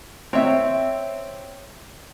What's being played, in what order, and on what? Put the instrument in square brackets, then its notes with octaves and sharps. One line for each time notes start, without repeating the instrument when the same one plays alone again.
[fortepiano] C4 [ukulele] C#5 E5